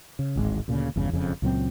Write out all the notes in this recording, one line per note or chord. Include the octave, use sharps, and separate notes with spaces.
C#3
D1 G#1 G#3
D2 A#2 C#3
G1 E2 G2 C#3
E1 F2 C#3
C#2 A#2 F#3 C4